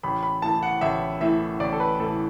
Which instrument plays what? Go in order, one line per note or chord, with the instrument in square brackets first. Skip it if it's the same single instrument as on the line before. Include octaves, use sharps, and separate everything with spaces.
[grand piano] A1 B5
B5
A2 E3 A5
F#5
A1 E5
A2 E3 E5
A1 D5
A4
B4
A2 E3 A4